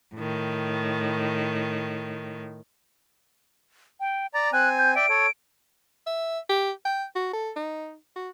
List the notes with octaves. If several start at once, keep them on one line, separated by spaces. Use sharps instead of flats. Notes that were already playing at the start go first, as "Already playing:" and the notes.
A2 D#3
G5
D5 A#5 A6
C4 G#5 F#6
G6
D5 E5 G5 D7
A4 C#5
E5
G4
G5
F#4
A4
D#4
F#4